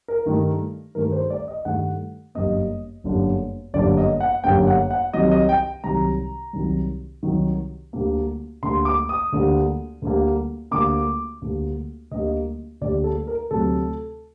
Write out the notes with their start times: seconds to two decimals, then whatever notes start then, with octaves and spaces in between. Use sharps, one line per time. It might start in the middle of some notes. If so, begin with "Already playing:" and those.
0.08 A#4
0.26 G2 D#3 A3
0.95 G2 D#3 A3 A#4
1.12 C5
1.30 D5
1.48 D#5
1.65 G2 D#3 A3 F#5
2.35 G1 F#2 D3 G3 A#3 D#5
3.04 G1 F#2 D3 G3 A#3
3.74 G1 F#2 D3 G3 A#3 D5
3.97 D#5
4.20 F#5
4.44 G1 F#2 D3 G3 A#3 G5
4.67 F#5
4.91 F#5
5.14 C2 C3 D#3 F#3 D#5
5.31 D#5
5.49 G5
5.84 C2 C3 D#3 F#3 A#5
6.53 C2 C3 D#3 F#3
7.23 C2 C3 D#3 F#3
7.93 D2 D3 G3 A#3
8.63 D2 D3 G3 A#3 C6
8.85 D6
9.09 D#6
9.32 D2 D3 G3 A#3
10.02 D2 D3 G3 A#3
10.71 D2 D3 G3 A#3 D6
11.42 D2 D3 G3 A#3
12.11 D2 D3 G3 A#3 D#5
12.81 D2 D3 G3 A#3 D5
13.04 A4
13.27 A#4
13.51 D2 C3 F#3 A3 A4